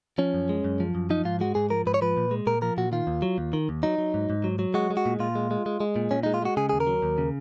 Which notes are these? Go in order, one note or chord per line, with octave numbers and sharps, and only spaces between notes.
F3 C#4
F#2
G#3
F#2
F3
F#2
F3 D#4
G#2 F4
G#3 F#4
G#2 G#4
F3 A#4
G#2 B4
C#5
F3 B4
A#2
G#3
A#2 A#4
F3 A#4
A#2 F#4
D#3 F4
D#2
F#3
D#2
D#3
D#2
F#3 D#4
F#3
G#2
G#2
F#3
F#3
G#3 F#4
G#3
F#4
A#2
A#2 F4
G#3
G#3
G#3
G#3
A#2
A#2 C#4
G#3 D#4
F4
G#3 F#4
C#3 G#4
D#2 G#4
A#4
F#3
D#2
C#3